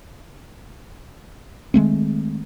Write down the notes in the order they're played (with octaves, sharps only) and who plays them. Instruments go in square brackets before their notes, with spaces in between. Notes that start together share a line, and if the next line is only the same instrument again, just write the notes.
[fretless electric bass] D#3 G#3 A3 C4